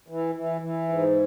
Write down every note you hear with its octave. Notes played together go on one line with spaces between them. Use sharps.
E3
E3
E3
G#2